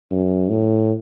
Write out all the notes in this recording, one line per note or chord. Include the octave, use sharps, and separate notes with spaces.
F#2
A2